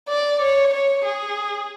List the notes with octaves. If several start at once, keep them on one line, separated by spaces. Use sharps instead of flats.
D5
C#5
C#5
G#4